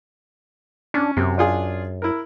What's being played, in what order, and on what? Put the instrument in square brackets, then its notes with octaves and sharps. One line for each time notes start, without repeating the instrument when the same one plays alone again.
[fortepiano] C#4 [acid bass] D4
[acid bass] F#2 [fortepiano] C3
[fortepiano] D4 F4 G#4
E4 A#4